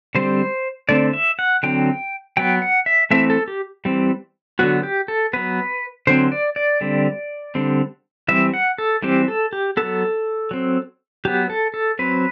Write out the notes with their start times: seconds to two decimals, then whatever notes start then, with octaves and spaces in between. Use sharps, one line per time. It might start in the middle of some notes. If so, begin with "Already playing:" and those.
0.15 D3 G3 C4 C5
0.89 D3 A3 C4 D5
1.13 E5
1.39 F#5
1.63 D3 F#3 C4 G5
2.37 F#3 B3 G5
2.62 F#5
2.86 E5
3.11 E3 A3 C4 E5
3.30 A4
3.48 G4
3.85 E3 G3 C4
4.59 D3 F#3 B3 F#4
4.83 G4
5.08 A4
5.33 F#3 B3 B4
6.07 D3 F#3 C4 C5
6.32 D5
6.56 D5
6.81 D3 G3 C4
7.55 D3 G3 C4
8.28 E3 G3 C4 E5
8.54 F#5
8.78 A4
9.03 E3 G3 C4 G4
9.28 A4
9.53 G4
9.77 F#3 B3 A4
10.51 F#3 C4
11.25 F#3 B3 G4
11.50 A4
11.74 A4
11.99 F#3 C4 B4